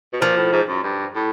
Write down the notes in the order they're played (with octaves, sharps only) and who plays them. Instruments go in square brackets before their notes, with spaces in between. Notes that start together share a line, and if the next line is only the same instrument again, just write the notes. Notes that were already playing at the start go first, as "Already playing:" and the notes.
[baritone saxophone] B2
[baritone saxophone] A#2 [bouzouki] F3
[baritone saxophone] A2
G#2
F#2
G2
A2